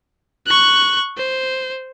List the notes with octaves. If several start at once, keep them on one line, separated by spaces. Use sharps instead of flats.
C#6 F#6
C5